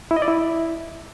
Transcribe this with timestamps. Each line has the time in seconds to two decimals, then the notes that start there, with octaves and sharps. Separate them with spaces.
0.11 E4
0.16 D#5
0.22 D5
0.28 E4